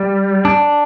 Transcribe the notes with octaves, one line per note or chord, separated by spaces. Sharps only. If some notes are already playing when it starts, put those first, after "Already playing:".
Already playing: G3
D4